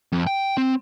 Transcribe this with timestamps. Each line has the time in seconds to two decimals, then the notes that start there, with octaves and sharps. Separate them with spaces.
0.12 F2
0.27 G5
0.57 C4